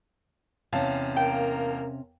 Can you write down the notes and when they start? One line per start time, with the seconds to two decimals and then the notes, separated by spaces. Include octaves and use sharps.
0.72 E2 C3 C#4 F5 A5
1.16 A#3 A#4 G5